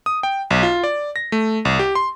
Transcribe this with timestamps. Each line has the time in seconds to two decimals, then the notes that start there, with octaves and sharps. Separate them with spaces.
0.06 D#6
0.23 G5
0.50 B1
0.63 F4
0.84 D5
1.16 A#6
1.32 A3
1.65 C2
1.79 G4
1.95 C6